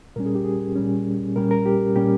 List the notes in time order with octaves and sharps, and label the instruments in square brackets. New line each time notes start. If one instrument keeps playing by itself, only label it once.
[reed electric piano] A#2 G3 C#4 A#4
G#4
G4
G#4
A#2 G3 C#4
A#2 G3 C#4 A#4
A#4
G4
A#2 G3 C#4 G4